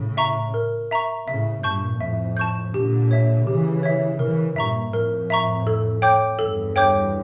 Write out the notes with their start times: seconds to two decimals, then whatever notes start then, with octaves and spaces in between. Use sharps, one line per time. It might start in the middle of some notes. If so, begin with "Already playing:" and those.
Already playing: A2 C#3
0.17 E5 A#5 C#6
0.54 A#4
0.91 E5 A#5 C#6
1.27 A2 C#3 E5
1.63 G2 A#2 A5 C#6 G6
2.00 F2 A2 E5
2.37 A5 C#6 G6
2.74 A#2 D3 G4
3.11 C#5 E5
3.46 C#3 E3 G4
3.83 C#5 E5
4.19 C#3 E3 A#4
4.56 G2 A#2 E5 A#5 C#6
4.92 F2 A2 A#4
5.30 E5 A#5 C#6
5.67 A4
6.02 C#5 G5 D6 G6
6.39 E2 G2 A4
6.76 C#5 G5 D6 G6